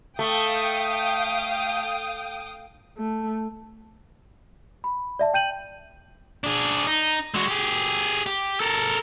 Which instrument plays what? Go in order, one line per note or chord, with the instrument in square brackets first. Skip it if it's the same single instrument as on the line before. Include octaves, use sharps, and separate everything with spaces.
[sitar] A3 [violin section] F5 G5 D#6
[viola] A3
[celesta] B5
D5 E5 A5
G5 G6 D#7 F#7
[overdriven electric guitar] D4 G#4
D#4
G#3 F#4
G4 G#4
G4
A4 A#4